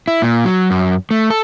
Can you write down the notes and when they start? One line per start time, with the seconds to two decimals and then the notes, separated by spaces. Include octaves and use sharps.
0.08 E4
0.22 A#2
0.45 F#3
0.70 F#2
1.11 A3
1.30 A4